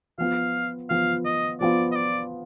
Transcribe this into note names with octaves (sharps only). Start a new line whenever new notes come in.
F3 B3 F4 F5
F3 B3 F4 F5
D#5
F3 B3 F4 D5
D#5
D5